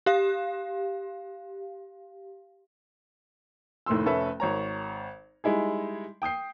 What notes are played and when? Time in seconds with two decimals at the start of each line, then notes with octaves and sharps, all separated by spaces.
0.06 G4 F5
3.86 F1 A2 D#3 C6 E6
4.06 F1 C#4 A4 B4 E5
4.40 G#1 C#5 A#5
5.44 G3 G#3 D#4 E4 G#4
6.22 G5 D#6 G6 C7